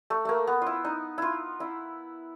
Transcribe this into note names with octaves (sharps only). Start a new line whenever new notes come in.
A3
A3 A#3
B3
E4 F4
D#4
E4 F4
E4